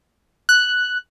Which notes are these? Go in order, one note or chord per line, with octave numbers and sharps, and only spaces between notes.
F#6